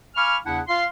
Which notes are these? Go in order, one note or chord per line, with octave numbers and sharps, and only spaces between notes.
F5 G#5 B5 C#6 D6 F6
E2 C#3 D4 E4 F#5
F4 F5 C6